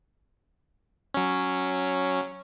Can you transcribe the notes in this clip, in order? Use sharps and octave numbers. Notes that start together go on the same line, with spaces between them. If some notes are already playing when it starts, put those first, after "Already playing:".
F#3 C#4